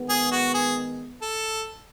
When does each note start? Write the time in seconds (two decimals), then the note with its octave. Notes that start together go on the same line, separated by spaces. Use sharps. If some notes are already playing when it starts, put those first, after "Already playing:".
Already playing: D#3 G#3 B3
0.09 G#4
0.32 F#4
0.54 G#4
1.22 A4